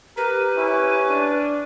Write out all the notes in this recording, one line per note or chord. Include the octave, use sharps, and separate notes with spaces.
G4 A#4 B4
C#4 E4
D4